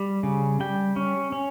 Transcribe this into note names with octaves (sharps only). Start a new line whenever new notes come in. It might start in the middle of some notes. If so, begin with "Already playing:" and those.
Already playing: G3
C#3
G3 G5
C#4
C#4